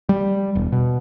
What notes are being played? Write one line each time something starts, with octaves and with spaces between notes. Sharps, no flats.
G3
E1
B2